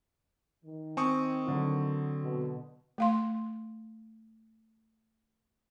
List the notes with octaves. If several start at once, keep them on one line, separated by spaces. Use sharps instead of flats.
D#3
C4 G#5 C#6 D#6
D3 F#3 F#4
B2
A3 F5 C6